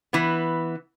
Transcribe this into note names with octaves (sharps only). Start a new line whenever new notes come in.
E3 B3